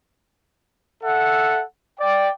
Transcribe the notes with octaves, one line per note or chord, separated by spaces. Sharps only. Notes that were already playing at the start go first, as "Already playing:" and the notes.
A4 E5 F#5
D5 G5